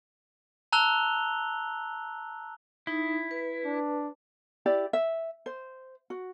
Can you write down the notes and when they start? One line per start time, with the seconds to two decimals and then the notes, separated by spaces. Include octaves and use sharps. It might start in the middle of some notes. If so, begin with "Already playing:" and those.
0.72 A5 A#5 E6 F#6 F7 G7
2.87 D#4 E4
3.31 B4
3.65 D4
4.66 E4 G4 D5
4.93 E5
5.46 C5
6.10 F#4